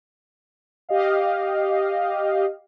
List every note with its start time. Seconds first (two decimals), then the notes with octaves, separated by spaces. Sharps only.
0.89 G4 D#5 F5